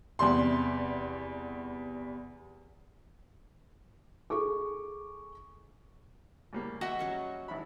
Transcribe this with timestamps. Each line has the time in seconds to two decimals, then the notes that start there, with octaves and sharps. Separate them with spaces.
0.19 E2 C3 G3 C6
4.30 G#4 A4 C#6 D6
6.53 C#2 G3 A#3
6.81 F#4 D#5 E5 G5
6.99 F#3 C#4 C#6
7.48 G#1 E4 B5